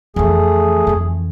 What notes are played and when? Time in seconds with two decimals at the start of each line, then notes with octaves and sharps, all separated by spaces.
0.16 F2 E3 A3 G#4
0.87 F2 E3